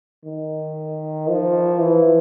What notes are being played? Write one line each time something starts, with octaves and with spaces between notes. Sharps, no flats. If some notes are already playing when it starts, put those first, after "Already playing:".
D#3
F3
E3